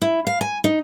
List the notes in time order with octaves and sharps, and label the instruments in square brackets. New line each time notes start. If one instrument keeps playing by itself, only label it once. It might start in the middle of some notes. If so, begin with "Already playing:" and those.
[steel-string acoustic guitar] E4
F5
G#5
D#4